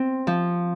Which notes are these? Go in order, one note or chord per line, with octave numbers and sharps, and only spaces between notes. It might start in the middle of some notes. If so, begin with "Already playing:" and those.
Already playing: C4
F3